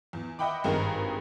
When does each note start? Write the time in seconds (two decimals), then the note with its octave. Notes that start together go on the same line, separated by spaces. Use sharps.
0.13 E2
0.39 D#5 E5 F#5 G5 B5 D6
0.64 G#1 G2 G#4 A#4 A#5